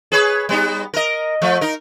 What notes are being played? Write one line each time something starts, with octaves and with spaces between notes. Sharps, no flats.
G#4 B4 C#5
G3 B3 D#4
A#4 D#5
F3 A3
D#4 A#4